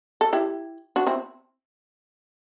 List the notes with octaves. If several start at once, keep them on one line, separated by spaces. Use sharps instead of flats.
A4
E4 G4
D4 F#4
C4 E4